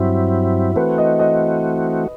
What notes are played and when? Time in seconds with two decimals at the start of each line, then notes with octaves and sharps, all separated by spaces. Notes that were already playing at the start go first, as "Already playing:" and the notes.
Already playing: G2 F#3 C4 E4
0.76 E3 A3 C4 F#4 B4
0.98 D#5
1.19 D#5